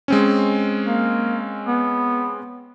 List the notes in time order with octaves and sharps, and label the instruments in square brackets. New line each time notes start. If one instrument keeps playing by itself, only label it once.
[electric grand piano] G#3 C4 C#4
[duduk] A#3
B3